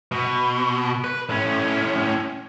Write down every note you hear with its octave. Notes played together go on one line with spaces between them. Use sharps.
B2
B4
A2 C#4